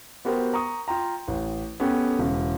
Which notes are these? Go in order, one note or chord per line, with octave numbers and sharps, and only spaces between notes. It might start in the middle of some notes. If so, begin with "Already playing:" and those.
B3 F#4 G4 A#4 C5
A#5 C#6 D#6
F4 G5 A#5
A1
B3 C#4 G4 A4
E1 C#3